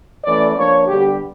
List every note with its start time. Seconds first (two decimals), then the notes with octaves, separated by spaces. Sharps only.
0.24 E3 A3 C#4 D5
0.55 F3 A#3 D4 C#5
0.87 D3 G3 B3 G4